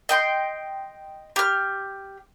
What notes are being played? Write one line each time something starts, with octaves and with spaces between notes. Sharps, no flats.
D#5 G5 C6
G4 F6